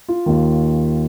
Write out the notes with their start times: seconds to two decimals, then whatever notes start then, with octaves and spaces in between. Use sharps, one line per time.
0.08 F4
0.26 D#2 D#3